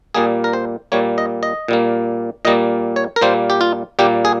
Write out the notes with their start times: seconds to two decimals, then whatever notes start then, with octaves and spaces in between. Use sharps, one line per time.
0.14 A#2 G3 A#3 G#4
0.44 A#4
0.53 C5
0.92 A#2 G3 A#3 C#5
1.18 D#5
1.43 D#5
1.68 A#2 G3 A#3
2.45 A#2 G3 A#3 D#5
2.96 C#5
3.16 A#4
3.21 A#2 G3 A#3 C5
3.50 G4
3.61 F4
3.99 A#2 G3 A#3 G4
4.25 G#4